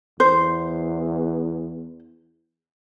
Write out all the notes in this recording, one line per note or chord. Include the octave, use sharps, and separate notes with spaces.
E2 C5